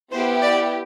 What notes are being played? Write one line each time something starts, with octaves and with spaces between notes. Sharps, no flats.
B3 E4 G4 C5
D5